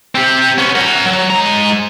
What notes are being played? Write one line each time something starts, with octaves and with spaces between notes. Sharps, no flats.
C4 G4
B3 C#4
A#4 F#5
F#3
G#3 A#5